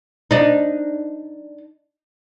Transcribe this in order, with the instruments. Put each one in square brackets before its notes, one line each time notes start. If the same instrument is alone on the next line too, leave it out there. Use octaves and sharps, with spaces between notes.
[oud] D4 D#4